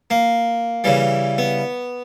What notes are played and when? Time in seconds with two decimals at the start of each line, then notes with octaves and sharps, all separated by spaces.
0.10 A#3
0.84 C#3 E3 G3
1.38 B3